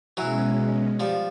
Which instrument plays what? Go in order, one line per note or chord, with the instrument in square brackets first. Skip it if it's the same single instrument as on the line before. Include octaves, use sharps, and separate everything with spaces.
[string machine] B2 G#3 C#4 [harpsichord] E3 F#3
[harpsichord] F3 G3